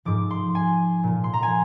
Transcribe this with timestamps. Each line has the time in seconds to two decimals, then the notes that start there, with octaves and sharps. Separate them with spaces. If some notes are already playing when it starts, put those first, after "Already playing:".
0.05 G#2 F3 D6
0.31 C6
0.55 G#5
1.03 A#2 F3
1.24 C6
1.33 A#5
1.43 G#5